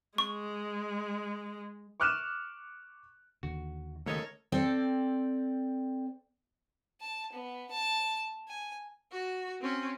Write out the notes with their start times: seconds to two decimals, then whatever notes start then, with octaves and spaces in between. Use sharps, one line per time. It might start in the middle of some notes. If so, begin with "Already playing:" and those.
0.18 G#3 C#6
2.00 C#6 D6 F6 F#6 D#7 E7
3.43 D#2 D3 F#4
4.06 D#2 C#3 A3 A4 A#4 C#5 D#5
4.52 C4 A4 D5 G5
7.01 A5
7.33 B3
7.71 A5
8.48 G#5
9.11 F#4
9.61 C4 C#4